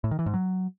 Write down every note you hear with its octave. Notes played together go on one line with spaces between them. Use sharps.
A2
D#3
E3
G#2
F#3